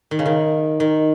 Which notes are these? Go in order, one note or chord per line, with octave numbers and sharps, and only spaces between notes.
D#3
C#3
D#3
D#3